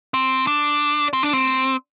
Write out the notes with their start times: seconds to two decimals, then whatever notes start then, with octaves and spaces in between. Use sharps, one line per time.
0.14 C4
0.47 D4
1.13 C4
1.23 D4
1.33 C4